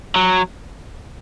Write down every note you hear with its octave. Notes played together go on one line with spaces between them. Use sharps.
F#3